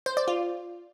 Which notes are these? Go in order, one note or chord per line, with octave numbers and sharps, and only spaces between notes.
C5
D5
F4